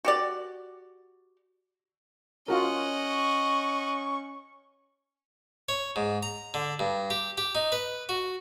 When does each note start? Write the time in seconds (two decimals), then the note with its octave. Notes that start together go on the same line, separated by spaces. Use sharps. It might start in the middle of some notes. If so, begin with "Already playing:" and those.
0.05 F#4 G4 D5
2.48 C#4 F4 F#4 A#4 D#5 F#5
3.10 C#6
5.69 C#5
5.96 G#2
6.23 A#5
6.54 D3
6.79 G2
7.10 G4
7.38 G4
7.55 D#4
7.72 B4
8.09 F#4